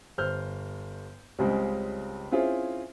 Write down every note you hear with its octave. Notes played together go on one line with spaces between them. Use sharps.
G1 C5 F6 G6
C#2 C#3 G3 G#3 C4
C4 C#4 E4 F4 G#4 C5